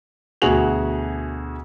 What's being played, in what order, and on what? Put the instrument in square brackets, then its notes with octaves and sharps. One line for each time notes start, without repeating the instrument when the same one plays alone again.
[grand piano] D2 B2 F#4 G#4 F7 F#7